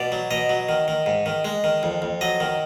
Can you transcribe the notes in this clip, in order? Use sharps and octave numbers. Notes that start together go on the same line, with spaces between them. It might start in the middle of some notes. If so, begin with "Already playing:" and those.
Already playing: B2 D5
F#3
B2 D#5
F#3
D#3
D#3
G#2
D#3
G#3
D#3
F2
F2
F#3 D#5
D#3